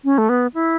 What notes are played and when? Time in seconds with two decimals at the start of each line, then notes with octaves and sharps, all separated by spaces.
0.04 C#4
0.18 A3
0.29 B3
0.54 E4